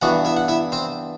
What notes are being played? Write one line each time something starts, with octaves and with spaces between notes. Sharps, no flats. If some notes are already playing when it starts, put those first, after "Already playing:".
G2 E3 B3 F#4 F#5
E4 E5
F#5
E4 E5
C4 C5